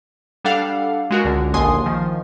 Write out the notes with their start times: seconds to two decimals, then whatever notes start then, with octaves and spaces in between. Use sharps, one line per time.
0.44 G3 D4 A4 F5 F#5
1.11 G#3 F#4 A#4
1.24 C#2 D3
1.54 A#1 D#2 D3 G#5 C6 D#6
1.86 D#3 F3